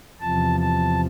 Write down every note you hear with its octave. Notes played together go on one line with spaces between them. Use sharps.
E2 C3 F3 A5
A5